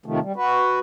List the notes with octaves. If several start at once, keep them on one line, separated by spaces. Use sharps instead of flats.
C3 D#3 F3 A3
G3
F#4 B4